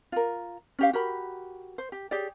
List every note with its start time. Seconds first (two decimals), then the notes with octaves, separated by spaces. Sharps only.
0.12 F4 A#4
0.79 C#4 G4 F5
0.93 F#4 G4 A#4 B5
1.78 C5
1.92 G4
2.11 G4 G#4 C#5 D5